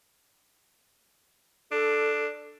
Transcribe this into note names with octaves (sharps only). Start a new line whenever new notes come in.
D4 A4